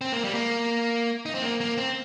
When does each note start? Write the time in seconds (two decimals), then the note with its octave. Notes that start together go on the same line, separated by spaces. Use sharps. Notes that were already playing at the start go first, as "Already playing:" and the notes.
0.01 C4
0.13 A#3
0.24 G3
0.34 A#3
1.26 D#4
1.35 C4
1.42 A#3
1.60 A#3
1.78 C4